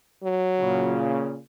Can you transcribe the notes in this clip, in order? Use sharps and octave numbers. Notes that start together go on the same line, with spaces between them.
F#3
A#2 C#3